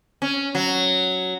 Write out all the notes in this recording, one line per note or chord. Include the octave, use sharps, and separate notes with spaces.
C#4
F#3